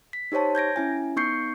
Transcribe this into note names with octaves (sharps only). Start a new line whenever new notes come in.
B6
D#4 G4 C5 C#5 A5
G6 G#6 A#6 D7
C#4 E4 G#5
B3 D#4 C#6 G6 C7 C#7